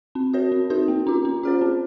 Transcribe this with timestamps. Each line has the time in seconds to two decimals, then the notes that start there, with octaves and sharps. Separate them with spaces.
0.15 C4
0.33 F#4 A#4 C#5
0.52 C4
0.70 D#4 F#4 A#4
0.88 A#3
1.07 C#4 F4
1.25 C#4
1.43 F4 G#4 C5
1.61 C4